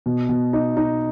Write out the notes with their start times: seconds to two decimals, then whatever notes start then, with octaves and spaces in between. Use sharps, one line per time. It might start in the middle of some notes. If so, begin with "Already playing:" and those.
0.06 B2
0.29 B2
0.53 D#4
0.77 D#4